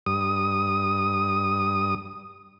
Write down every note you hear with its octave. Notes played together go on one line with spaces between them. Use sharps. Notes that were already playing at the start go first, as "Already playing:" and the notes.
G2 D#6